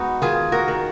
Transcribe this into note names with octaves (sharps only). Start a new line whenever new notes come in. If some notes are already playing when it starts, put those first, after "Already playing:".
Already playing: G#3 B3 D#4 F#4
D#3 F4 G#4
F#4 A#4
D#3